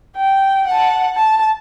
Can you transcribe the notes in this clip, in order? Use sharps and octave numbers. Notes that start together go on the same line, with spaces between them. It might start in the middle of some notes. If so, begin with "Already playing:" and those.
G5
F#5 A5
A5